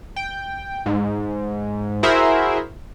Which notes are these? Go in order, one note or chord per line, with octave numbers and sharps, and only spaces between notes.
G5
G#2
E4 F#4 G#4 A#4 C5 E5